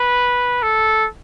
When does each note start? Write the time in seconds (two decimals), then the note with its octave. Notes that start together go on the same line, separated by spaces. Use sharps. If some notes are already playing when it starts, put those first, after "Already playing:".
Already playing: B4
0.63 A4